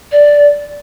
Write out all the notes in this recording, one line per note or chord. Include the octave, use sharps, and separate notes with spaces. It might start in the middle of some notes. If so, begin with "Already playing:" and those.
D5